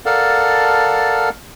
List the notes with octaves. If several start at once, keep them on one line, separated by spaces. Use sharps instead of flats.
A4 A#4 D5 F5 F#5 A5